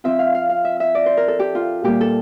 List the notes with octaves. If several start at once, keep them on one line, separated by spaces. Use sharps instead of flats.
F3 C4 F4 E5
F5
F5
F5
E5
E5
D5
C5
A#4
A4
G4
F4
A#2 G3 A#3 G4
A4